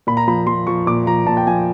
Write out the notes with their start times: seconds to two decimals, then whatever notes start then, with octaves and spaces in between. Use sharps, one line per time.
0.07 A#2 B5
0.17 A#5
0.28 F3 B5
0.47 F3 C6
0.67 F3 C#6
0.87 A#2 D6
1.07 F3 A#5
1.27 A#2 A5
1.37 G5
1.47 F3 G#5